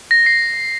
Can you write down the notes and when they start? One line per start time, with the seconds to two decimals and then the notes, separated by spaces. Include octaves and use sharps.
0.11 A#6
0.26 C7